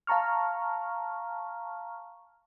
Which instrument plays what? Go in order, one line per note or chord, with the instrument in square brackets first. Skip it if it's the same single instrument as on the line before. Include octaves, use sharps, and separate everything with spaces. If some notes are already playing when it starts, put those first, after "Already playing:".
[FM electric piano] F5 A5 A#5 C#6 F6